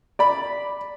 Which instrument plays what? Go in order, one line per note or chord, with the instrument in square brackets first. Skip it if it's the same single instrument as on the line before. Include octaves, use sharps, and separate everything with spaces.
[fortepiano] D5 B5